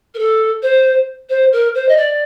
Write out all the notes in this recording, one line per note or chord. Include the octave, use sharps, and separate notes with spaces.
A#4
A4
C5
C5
A#4
C5
D#5
D5